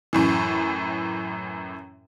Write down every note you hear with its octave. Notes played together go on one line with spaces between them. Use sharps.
F#2 A2 E3